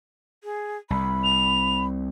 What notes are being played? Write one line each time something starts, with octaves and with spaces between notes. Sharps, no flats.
G#4
C2 B5
F7